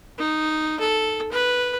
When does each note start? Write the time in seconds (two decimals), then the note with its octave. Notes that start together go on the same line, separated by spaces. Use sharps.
0.18 D#4
0.80 A4
1.32 B4